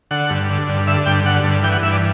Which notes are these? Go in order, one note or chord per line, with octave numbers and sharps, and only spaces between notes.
D3 F#5
G2
D3
G2
D3 E5
G2 G5
D3 F#5
G2
E3 G5
F#5
G2 E5
D5